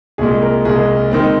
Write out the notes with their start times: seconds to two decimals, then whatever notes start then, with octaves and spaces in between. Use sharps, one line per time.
0.18 C2 A#2 G#3 G#4
0.42 A#4
0.65 C2 A#2 G#3 G#4
1.11 D#3 G#3 C4